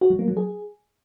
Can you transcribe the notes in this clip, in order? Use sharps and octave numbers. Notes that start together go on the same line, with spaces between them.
F#4
F#3
A#3
F#3
G#4